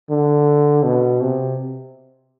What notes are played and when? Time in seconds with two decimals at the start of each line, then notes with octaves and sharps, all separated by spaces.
0.10 D3
0.84 B2
1.21 C3